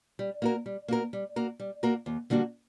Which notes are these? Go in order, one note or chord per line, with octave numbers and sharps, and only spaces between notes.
G3
A#3 F#4 A#4
G3
A#3 F#4 A#4
G3
A#3 F#4 A#4
G3
A#3 F#4 A#4
D#2
D3 G3 A#3 F#4